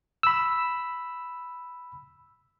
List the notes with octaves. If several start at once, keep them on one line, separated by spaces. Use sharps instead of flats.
B5 E6